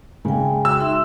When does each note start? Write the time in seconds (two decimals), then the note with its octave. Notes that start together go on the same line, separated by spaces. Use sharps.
0.25 C#3 G#3 G5 G#5
0.65 F#4 G5 E6
0.80 D#4 E5 C6